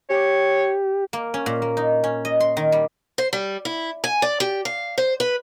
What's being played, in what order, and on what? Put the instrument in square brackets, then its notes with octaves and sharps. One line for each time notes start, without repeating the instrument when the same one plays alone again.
[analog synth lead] G4 [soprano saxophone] C#5
[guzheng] A#3
C#4
A#2
A#3
D#4
C#4
D#5
C6
D#3
G3
[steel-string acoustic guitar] C5
G3
E4
G#5
D5
G4
F5
C5
B4